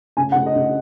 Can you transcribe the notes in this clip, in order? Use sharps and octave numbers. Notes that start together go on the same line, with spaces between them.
C#3 G#5
F#5
C#3
D#5
C#3